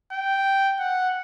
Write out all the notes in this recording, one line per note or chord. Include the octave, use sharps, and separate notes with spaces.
G5
F#5